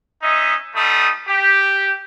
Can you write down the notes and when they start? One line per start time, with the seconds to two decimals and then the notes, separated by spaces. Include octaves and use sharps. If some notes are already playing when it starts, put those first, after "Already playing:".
0.22 C#4 D#4 D#5 E5
0.75 G3 A3 D#4 D#6
1.28 G4